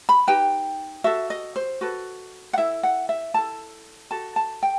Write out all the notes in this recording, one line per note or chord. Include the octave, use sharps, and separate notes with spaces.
B5
D#4 G4 B4 G5
F#4 A4 E5
D#5
C5
F#4 A4 B4
F#5
E4 A4 E5
F#5
E5
E4 A4 A5
F#4 A4 A5
A5
G5